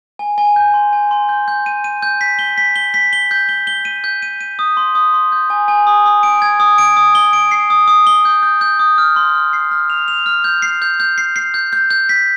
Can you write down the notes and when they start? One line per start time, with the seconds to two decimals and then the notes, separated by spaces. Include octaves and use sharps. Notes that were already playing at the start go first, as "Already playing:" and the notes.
0.19 G#5
0.38 G#5
0.56 G6
0.74 C6
0.93 G#5
1.11 C6
1.29 G6
1.48 G6
1.66 D#7
1.84 D#7
2.02 G6
2.21 B6
2.39 G7
2.58 B6
2.76 G7
2.94 B6
3.13 G7
3.31 G6
3.49 G7
3.67 G7
3.85 D#7
4.04 G6
4.22 D#7
4.41 D#7
4.59 D#6
4.77 C6
4.95 D#6
5.14 C6
5.32 G6
5.50 G#5
5.68 G#5
5.87 D#6
6.06 D#6
6.23 D7
6.42 G#6
6.60 D#6
6.78 D7
6.97 D#6
7.15 G7
7.33 D7
7.51 C7
7.70 D#6
7.88 D#6
8.07 G7
8.25 G6
8.43 G6
8.61 G6
8.79 D#6
8.98 F6
9.16 C6
9.35 F6
9.53 C7
9.71 F6
9.90 F7
10.08 F7
10.26 F6
10.44 G6
10.62 C7
10.82 G6
11.00 G6
11.18 C7
11.36 C7
11.54 G6
11.73 G6
11.91 G6
12.09 B6